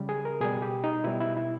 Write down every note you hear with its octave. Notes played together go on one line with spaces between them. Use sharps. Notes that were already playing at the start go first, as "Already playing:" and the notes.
Already playing: C#3 G3
G#4
A#4
B2 G3 G#4
G4
D#4
B2 G3 E4
E4
E4